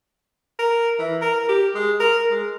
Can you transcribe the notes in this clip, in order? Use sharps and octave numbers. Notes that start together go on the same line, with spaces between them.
A#4
E3
A#4
G4
G#3
A#4
G#3